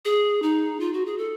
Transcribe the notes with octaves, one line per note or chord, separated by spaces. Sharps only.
G#4
D#4
F4
F#4
G#4
A4